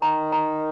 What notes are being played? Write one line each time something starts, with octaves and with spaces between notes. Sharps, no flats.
D#3 A#5
A#5